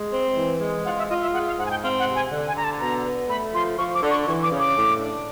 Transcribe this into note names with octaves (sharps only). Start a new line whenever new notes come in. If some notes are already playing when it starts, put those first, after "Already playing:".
Already playing: G#3
C4
E3
G#3
F4 F#5
E5
F4 D#5
E5
G#3 F#5
F5
G#2 F#5
G#5
G5
C4 F5
F#5
C3
G#5
D3
G#5
D3 A#5
A5
B2 A#5
B3
A3 B5
F3 C6
F3 C#6
D6
D3
C#6
E3 C#6
D6
C#3
D6
A2
D4